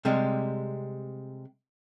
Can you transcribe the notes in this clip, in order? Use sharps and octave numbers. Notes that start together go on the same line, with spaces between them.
C3 G3 G#3